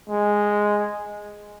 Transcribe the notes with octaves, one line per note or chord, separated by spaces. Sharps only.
G#3